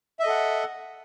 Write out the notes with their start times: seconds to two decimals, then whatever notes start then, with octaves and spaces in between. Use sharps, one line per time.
0.19 E5
0.23 D#5
0.26 A4
0.29 F#5